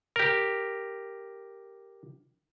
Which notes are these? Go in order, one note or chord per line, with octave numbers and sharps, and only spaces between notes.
G4 A#4